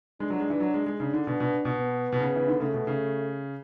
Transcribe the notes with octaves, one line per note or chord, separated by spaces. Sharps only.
G#3 D4
F#3
G#3
E3
F#3
G#3
G#3
C#3 D4
D3
B2
B2
B2
B3
B2
C#3 B3
E3
D3
C#3 A3
B2
C#3